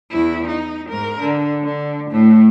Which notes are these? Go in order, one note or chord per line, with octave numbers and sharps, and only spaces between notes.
E2 E4
D#4
G#2 A#4
D3
D3
A2 A3